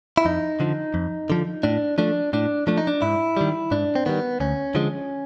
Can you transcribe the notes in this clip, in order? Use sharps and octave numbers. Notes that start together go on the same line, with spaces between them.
E4
F2 D#4
D3 F3
F2
D3 F3
A2 D4
F3 A3 D4
A2 D4
F3 A3 D4
D#4
D4
G#2 E4
D#3 G3
G#2 D4
C4
D#3 G3 B3
D2 C#4
D3 F3 G#3